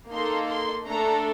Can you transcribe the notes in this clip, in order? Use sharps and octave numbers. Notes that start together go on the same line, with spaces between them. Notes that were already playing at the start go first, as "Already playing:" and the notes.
A#3 D#4 A4 C6
C6
A3 D4 A4 A#5